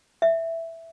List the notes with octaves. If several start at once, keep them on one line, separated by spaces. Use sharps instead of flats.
E5